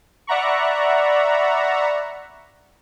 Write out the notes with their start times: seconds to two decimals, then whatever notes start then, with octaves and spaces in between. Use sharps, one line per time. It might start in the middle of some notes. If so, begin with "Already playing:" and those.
0.27 D5 E5 F#5 A#5 B5 C#6